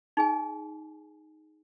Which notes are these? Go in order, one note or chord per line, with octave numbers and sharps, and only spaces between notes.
D#4 G#4 G#5